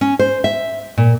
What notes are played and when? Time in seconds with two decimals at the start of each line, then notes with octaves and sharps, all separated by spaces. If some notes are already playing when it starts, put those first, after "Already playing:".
0.01 C#4
0.19 C5
0.44 E5
0.98 A#2